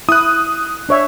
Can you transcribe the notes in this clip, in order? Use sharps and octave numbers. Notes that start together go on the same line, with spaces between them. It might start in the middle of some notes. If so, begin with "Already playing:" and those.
E4 D#6 F#6
D4 C#5 E5